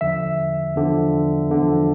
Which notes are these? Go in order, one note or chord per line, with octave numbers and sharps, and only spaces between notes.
E2 D3 F3 E5
E2 D3 F3
E2 D3 F3